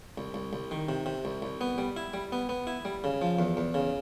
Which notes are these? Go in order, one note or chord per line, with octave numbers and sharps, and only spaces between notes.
C2
C2
C2
D#3
C3
C3
C2
C2
B3
G3
E4
G3
B3
B3
E4
G3
C#3
F3
E2
E2
C#3